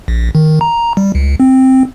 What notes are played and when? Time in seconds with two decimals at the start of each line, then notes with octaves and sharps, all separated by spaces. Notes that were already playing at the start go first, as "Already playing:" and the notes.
0.08 A#1
0.35 D#3
0.61 A#5
0.97 G3
1.15 C#2
1.40 C4